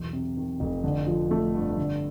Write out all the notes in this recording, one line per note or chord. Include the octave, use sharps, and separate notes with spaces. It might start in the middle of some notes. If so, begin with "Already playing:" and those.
Already playing: B1 E2
C3
D#3
F1
D3
F3
A3
G2
D3